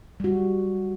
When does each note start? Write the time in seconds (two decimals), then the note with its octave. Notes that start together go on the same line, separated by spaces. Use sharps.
0.20 G3 F#4